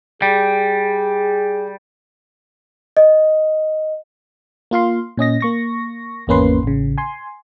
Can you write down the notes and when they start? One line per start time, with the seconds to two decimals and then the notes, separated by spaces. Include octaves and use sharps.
0.22 G3 G#4 G5
2.97 D#5
4.71 A#3 F4 F5 C6
5.17 A#2 C#4 D#5 A#6
5.41 A#3 C#6 A#6
6.27 G#1 E2 A#3 C#4 B4 C6
6.63 A1 C#3
6.98 G#5 C6